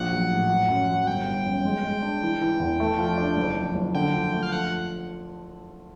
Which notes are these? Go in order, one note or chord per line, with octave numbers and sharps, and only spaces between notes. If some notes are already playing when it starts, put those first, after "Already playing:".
Already playing: A#1 F#5
F#3
A2
F#3
F#2
F#3
G1 G5
G1
F#2
G#3
G#3
D4
E3
E3
E2
A3
F3
D4
F#1
F3
F#1
D3 G5
F3
A3
F5
F3 F#5